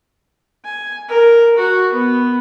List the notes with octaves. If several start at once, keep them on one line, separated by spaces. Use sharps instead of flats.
G#5
A#4
F#4
B3